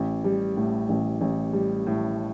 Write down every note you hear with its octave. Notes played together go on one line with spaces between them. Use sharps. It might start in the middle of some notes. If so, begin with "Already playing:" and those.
Already playing: A1
G3
A2
A1
A1
G3
A2